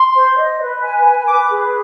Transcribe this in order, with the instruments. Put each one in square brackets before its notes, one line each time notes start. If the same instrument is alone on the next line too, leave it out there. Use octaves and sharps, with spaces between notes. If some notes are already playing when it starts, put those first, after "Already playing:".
Already playing: [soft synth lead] C6
[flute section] C5
D#5
B4
G#5
B4
[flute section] B4 [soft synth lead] D6
[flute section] G#4